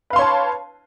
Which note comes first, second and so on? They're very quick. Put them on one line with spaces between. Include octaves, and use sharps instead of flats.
B4 F5 C6 C#5 A5